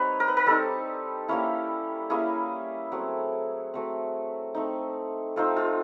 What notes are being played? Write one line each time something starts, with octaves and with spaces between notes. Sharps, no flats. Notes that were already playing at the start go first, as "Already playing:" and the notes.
Already playing: G3 C4 D#4 B4 C#5
A#4
B4
A#4
G3 C4 D#4 A4
G3 A#3 C#4 E4
G3 A#3 C#4 E4 G#4
F#3 A3 C4
F#3 A3 C4
A3 C4 D#4
A3 C4 D#4 F4
F4